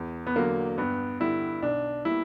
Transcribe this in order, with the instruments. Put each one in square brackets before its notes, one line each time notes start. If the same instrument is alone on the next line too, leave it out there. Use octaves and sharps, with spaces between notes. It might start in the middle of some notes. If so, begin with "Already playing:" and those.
Already playing: [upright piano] E2
[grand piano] B3
[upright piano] D3 F#3 [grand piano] A#3
[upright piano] G2 [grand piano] B3
[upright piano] D3 G3 B3 [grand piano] E4
[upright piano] B1 [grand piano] D4
[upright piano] B2 G3 A#3 [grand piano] E4